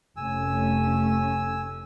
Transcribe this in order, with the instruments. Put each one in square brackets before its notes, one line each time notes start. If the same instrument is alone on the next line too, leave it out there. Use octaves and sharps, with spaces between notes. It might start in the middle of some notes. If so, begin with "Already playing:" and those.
[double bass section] F1 A3 C#4 [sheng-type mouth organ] G#5 E6